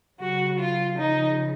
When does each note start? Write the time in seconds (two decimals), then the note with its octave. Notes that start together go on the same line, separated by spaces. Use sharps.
0.19 C#3 F#3 F#4
0.59 F4
0.98 C#3 F3 D#4